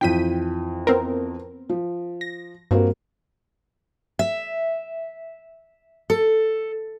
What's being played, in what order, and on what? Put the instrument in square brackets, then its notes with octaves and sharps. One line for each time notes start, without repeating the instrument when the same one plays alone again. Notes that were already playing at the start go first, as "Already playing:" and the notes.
[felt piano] F2 E3 [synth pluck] G5 B6 D#7
[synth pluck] B3 C4 A#4
[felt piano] F3
[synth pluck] A#6
[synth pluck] G2 [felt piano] A#3 C4 F#4
[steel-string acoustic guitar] E5
A4